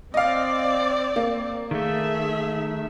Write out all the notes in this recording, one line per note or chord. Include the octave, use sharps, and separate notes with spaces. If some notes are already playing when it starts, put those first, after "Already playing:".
C4 D5 D#5 F5
A#3
D#3 A3 G#4 E5